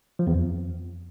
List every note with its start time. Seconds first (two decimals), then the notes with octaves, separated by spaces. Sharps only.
0.19 F3
0.27 E2
0.34 F2